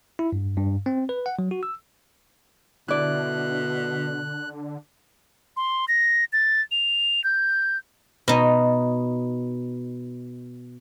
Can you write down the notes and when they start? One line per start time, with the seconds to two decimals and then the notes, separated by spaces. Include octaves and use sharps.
0.19 E4
0.33 G2
0.57 G2
0.86 C4
1.09 B4
1.26 F#5
1.39 F#3
1.51 F#4
1.63 E6
2.88 B2 D3 E4 D5 F#6
5.57 C6
5.88 A#6
6.33 A6
6.71 F7
7.24 G6
8.28 B2 D#4